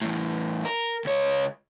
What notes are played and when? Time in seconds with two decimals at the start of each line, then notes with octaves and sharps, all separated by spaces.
0.02 E2 A2
0.65 A#4
1.05 C#2 C#5